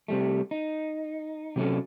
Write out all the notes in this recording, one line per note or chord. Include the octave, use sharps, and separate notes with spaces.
C3 G3 A3
D#4
C3 F#3 C#4 A4